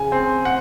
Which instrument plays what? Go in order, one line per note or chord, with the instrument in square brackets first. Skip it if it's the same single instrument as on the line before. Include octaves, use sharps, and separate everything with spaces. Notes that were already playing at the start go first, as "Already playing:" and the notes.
Already playing: [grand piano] C#3 G#5
C4
F#5